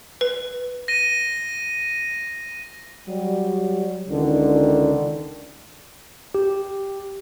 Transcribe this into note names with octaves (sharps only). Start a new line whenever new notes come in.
B4
A#6 D#7
F#3 G3
C#2 D3 D#3
G4